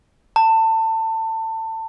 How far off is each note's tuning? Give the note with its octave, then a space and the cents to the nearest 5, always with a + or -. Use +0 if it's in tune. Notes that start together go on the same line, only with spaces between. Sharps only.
A5 +25